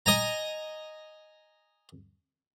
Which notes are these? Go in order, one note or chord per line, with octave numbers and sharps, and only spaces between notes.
D#5 G#5 A#5